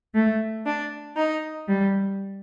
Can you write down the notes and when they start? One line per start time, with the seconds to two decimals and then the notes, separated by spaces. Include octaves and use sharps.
0.14 A3
0.66 D4
1.16 D#4
1.68 G3